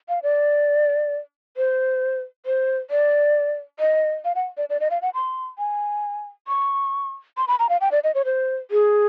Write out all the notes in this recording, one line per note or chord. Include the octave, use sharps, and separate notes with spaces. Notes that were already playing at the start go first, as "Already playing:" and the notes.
F5
D5
C5
C5
D5
D#5
F5
F#5
D5
D5
D#5
F5
F#5
C6
G#5
C#6
C6
B5
A#5
F5
G5
D5
D#5
C#5
C5
G#4